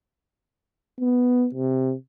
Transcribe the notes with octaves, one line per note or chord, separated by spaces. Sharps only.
B3
C3